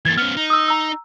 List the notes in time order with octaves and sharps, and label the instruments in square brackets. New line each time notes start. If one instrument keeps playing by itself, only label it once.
[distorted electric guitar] E3 A#3 [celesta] G#6 A6
[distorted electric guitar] B3 C#4 [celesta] F6
[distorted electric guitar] D#4
[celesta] D#6 E6
A#5 E6